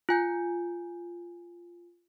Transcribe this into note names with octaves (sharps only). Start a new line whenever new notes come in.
F4 G#5 G6